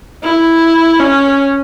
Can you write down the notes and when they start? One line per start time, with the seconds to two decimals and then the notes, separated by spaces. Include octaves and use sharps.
0.23 E4
0.99 C#4